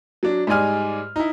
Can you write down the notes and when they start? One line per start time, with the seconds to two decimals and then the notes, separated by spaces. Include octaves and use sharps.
0.23 F#3 D4
0.47 G#2 G3 G#3 D5 G#5 F6
1.16 D#4 E4